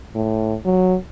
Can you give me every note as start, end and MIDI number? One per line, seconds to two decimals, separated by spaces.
0.15 0.55 45
0.65 0.95 54